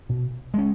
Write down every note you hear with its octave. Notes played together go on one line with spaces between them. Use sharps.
B2
G#3 C#4